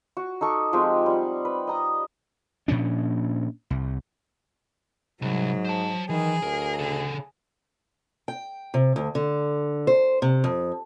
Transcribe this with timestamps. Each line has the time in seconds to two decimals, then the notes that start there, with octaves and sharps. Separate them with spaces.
0.17 F#4
0.41 D#4 A4 C#6 D6
0.73 F3 G#3 C4 G4
1.06 G3 F#5
1.45 B4
1.67 D#5 A#5 D#6
2.68 A#2 F3 C#4 D4
3.70 C2
5.22 C2 G#2 F#3
5.65 C5 A5
6.10 D#3 E3 G#4
6.43 D2 A#4
6.79 C#3 A4
8.28 G5
8.74 C3
8.96 D2
9.15 D3
9.87 C5
10.22 C3
10.44 F2